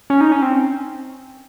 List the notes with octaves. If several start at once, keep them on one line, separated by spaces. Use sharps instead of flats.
C#4
D#4
C#4
C4